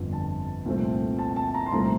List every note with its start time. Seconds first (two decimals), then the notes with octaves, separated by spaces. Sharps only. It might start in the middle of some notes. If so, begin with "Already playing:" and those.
Already playing: G1 F2 D3
0.13 A5
0.65 C2 A#2 F3 A3 C4
1.19 A5
1.36 A5
1.54 A#5
1.66 C6
1.72 C2 A#2 F3 A3 A#5